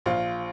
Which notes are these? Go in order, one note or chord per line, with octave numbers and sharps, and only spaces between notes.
A#1 F4